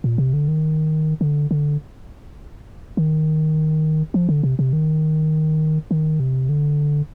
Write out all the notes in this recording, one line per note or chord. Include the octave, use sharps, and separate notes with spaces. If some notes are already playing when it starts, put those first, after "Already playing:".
A#2
C3
D3
D#3
D3
D3
D#3
F3
D3
C3
C3
D#3
D#3
C3
D3